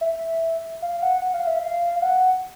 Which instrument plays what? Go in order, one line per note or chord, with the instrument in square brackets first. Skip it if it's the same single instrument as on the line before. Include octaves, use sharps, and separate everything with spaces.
[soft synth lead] E5
F5
F#5
F#5
F5
E5
F5
F5
F#5